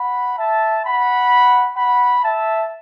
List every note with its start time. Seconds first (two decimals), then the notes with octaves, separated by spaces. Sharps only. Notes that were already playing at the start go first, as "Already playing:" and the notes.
Already playing: F#5 B5
0.38 E5 A5
0.84 F#5 B5
1.77 F#5 B5
2.24 E5 A5